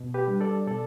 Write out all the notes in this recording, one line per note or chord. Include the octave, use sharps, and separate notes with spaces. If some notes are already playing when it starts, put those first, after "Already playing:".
Already playing: B2
G4 B4
G3 D4
A4 D5
B2 A4 D5